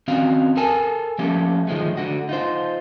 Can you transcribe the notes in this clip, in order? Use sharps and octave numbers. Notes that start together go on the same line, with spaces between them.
D#3 C4 C#4 F#4 F5
A4 A#4 G#5 A5
F3 A3 A#3 C#4 G4
D#3 F3 G#3 A3
D3 F#4
D#4 F4 C5